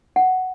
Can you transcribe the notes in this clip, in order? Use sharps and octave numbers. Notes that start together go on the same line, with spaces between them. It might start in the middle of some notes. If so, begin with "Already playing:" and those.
F#5